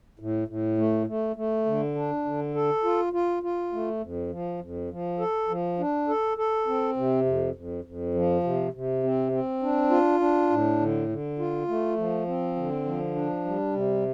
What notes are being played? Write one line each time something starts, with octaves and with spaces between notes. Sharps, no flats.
A2
A2
A3
A3
A3
D3
D4
D3
A4
F4
F4
F4
A3
F2
F3
F2
F3
A4
F3
D4
A4
A4
C4
C3
F2
F2
F2
F3
C3
C3
C4
C4
D4
F4
D4
A2
D3
D3
F4
A3
F3
C4
D3
F3
D4
G3
C3